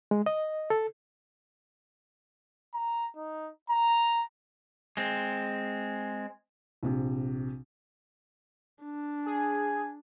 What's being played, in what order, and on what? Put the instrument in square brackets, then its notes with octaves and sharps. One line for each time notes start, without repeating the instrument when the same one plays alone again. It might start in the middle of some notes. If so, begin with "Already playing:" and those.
[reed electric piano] G#3
D#5
A4
[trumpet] A#5
D#4
A#5
[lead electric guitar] G#3 C4
[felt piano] A#1 C3
[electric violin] D4
[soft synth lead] G#4 [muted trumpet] G#5